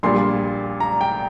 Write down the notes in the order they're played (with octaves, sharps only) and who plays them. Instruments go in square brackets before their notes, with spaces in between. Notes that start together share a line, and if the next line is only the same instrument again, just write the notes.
[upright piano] A#1 A#2 G3 C6
A#5
G5